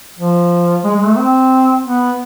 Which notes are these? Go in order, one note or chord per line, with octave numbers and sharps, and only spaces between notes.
F3
G#3
G#3
A3
C4
B3